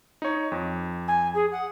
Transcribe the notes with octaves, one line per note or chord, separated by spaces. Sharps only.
D#4 C#5
F2
G#5
G#4
F#5